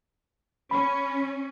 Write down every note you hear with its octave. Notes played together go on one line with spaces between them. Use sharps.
C#4 B5